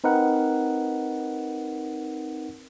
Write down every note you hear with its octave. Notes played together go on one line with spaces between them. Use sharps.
C4 D#4 A#4 B4 F#5